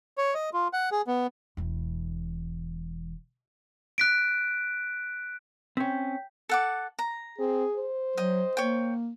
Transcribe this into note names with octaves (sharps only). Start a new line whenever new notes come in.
C#5
D#5
F4
F#5
G#4
B3
E1 E3
F#6 B6 D7
C4 C#4 G5 G6 B6
A4 F#5 D6
A#5
C4 G#4
C5
F#3 D#5 G5
A#3 C#5 G5